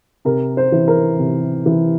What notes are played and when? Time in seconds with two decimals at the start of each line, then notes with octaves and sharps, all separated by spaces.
0.25 C3 A#4
0.57 C5
0.72 E3
0.88 A#4
1.19 C3
1.66 E3